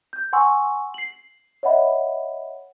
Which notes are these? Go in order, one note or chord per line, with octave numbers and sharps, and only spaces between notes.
G6
F#5 G#5 C6 C#6 E6
C7 F#7
C#5 D#5 E5 F#5 B5